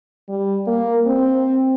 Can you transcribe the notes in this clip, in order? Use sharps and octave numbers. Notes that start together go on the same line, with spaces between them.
G3
A#3
C4